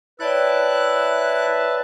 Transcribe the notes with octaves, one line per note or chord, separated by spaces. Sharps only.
E4 B4 C#5 D5 E5 G5 A5 F#6